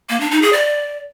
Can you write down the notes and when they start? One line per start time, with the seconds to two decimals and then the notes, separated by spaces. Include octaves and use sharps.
0.10 A#3
0.20 D4
0.31 D#4
0.42 G#4
0.53 D5